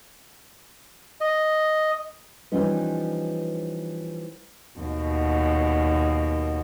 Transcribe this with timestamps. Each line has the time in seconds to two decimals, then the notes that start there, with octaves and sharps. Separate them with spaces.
1.21 D#5
2.52 E3 F3 G3 C#4 D#4 B4
4.80 D#2 B2